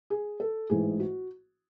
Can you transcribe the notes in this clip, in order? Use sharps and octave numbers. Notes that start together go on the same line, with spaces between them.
G#4
A4
A1 G#2 E3 G#4
F#4